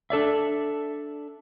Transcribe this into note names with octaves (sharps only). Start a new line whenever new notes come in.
D4 A4 D5 E5